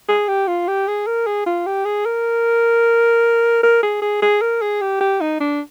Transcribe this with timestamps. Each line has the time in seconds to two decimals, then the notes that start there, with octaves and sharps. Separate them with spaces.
0.09 G#4
0.28 G4
0.48 F4
0.68 G4
0.88 G#4
1.07 A#4
1.27 G#4
1.46 F4
1.66 G4
1.85 G#4
2.06 A#4
3.63 A#4
3.83 G#4
4.02 G#4
4.22 G#4
4.41 A#4
4.62 G#4
4.81 G4
5.01 G4
5.21 D#4
5.40 D4